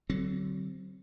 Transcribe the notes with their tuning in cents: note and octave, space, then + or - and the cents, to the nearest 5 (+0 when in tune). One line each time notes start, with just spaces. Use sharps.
D3 +0 F#3 +25 C4 +0